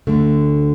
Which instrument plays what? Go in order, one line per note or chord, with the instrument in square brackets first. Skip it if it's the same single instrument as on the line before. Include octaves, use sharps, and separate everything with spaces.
[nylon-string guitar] D2 D3 A3